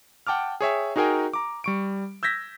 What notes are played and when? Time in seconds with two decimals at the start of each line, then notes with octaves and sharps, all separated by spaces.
0.27 F#5 G5 A5 D6 F6
0.61 G#4 C#5 E5 G5
0.96 D#4 F#4 G#4 A#4 G5 G#5
1.33 A#5 D6
1.64 G3 C#6 D7
2.23 E6 G6 G#6 A#6 B6